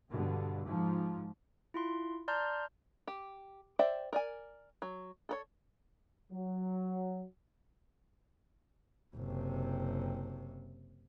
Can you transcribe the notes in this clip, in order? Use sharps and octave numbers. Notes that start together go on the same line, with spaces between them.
G2 B2 D3
G#2 F3
E4 F4 C6
D5 A5 A#5 C6 F6 G6
G4
C5 D5 E5 G5
A#4 D5 G#5
F#3
A4 A#4 C#5
F#3
F#1 C3